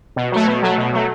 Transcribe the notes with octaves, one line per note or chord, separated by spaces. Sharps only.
B2
F#3 A3
B2
F#3 A3
B2
F#3 A3